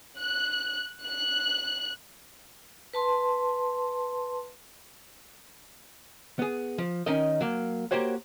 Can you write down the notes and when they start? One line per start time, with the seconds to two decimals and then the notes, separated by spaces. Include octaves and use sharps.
0.19 F#6
1.03 F#6
2.93 B4 A5 C6
6.39 B3 G#4
6.78 F3
7.06 D#3 C#4 D#4 A#4 D#5
7.41 F#3 A#3
7.91 A#3 F#4 G4 C5 C#5 F#5